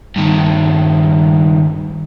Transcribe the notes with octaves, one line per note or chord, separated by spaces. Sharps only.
G2 D#3